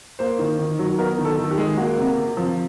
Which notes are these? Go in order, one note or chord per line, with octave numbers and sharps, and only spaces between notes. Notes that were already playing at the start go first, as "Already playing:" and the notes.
A#3 C5
D#3
D#3
F#3
B3 A#4
D#3
A4
D#3
G4
G#3
A#3 F#4
C3
C3
F3